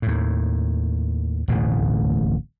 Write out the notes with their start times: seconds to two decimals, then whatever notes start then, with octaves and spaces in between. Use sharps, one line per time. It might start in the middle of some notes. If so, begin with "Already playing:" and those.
0.02 D#2 A2
1.48 D1 A1 D#2 B2